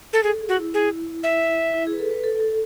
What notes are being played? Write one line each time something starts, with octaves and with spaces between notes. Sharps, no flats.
A4
G#4 A4
G#4
F#4
E4
G#4
E5
E4
G#4
B4
A4
B4
A4
A4